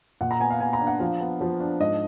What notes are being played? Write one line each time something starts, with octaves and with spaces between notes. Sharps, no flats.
A#2 F#5
A#5
B3 G#5
F5
B3 G#5
A#5
D4
F#5
F3 F5
B3
F3
D4
G#2 D#5